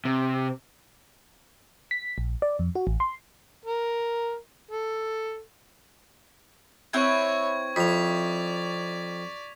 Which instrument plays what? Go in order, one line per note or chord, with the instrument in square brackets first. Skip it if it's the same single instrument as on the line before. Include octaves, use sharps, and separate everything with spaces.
[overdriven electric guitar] C3
[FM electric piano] B6
A#1
D5
F2
F#4
A1
C6
[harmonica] A#4
A4
[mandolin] C4 E4 B4 [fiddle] C#5 [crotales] C#6 G#6
[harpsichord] F2 [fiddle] D5 [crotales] B6 F7